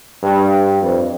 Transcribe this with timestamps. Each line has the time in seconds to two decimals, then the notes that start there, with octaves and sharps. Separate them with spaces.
0.23 G2
0.82 F2